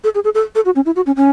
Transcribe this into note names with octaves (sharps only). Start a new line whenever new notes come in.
A4
G#4
A4
A4
A4
F#4
C#4
E4
F#4
C#4
C#4